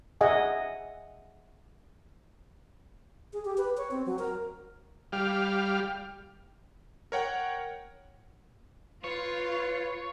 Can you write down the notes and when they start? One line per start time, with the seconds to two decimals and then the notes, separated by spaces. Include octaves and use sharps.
0.21 G#4 D#5 E5 F#5 G#5
3.33 G#4
3.45 G4
3.58 B4
3.77 C#5
3.91 C4
4.06 F#3
4.19 A#4
5.12 G3 F5
7.12 A#4 C#5 F#5 G5
9.04 F4 B4 C#5